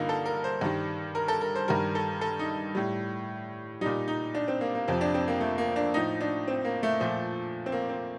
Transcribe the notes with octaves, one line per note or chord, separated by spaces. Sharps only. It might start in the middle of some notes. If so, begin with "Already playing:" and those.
Already playing: G2 D3 A#3 D#4 F4
A4
A#4
C5
G2 D#3 G3
A#4
A4
A#4
C5
G2 D#3 G3 A#4
A4
A4
D#4
A2 G3
A#2 G3 D#4
D#4
D4
C4
A#3
A#3
F2 C3 F3 C4
D4
C4
A#3
A3
A#3
D4
A2 F3 D#4
D4
C4
A#3
A3
A#2 F3
C4
A#3
C4